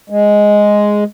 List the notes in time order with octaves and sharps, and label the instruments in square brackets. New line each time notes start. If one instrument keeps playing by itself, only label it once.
[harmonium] G#3